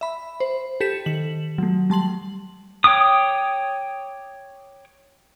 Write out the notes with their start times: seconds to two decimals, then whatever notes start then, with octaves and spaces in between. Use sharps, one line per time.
0.01 E5 B5
0.40 C5
0.81 G4 A4 B6 C#7 E7
1.06 D#3 F#7
1.58 F#3 A3
1.90 G3 A5 C6 F#7
2.84 C#5 G5 D6 D#6